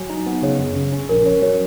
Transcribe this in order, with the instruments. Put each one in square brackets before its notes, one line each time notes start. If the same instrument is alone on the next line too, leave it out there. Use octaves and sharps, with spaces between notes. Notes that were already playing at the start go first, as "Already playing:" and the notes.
Already playing: [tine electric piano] F#3 [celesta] G#5
[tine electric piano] D#4
B3
[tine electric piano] C#3 [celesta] C#5
[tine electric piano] F#2
C#3
C#4
[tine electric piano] A#1 [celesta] A#4
[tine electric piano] C#4 [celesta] C#5
[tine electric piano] F#3 [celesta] C#5